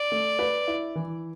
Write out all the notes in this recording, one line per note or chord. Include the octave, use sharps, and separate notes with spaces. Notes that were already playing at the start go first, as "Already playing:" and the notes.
Already playing: D5
A3
B4
E4
E3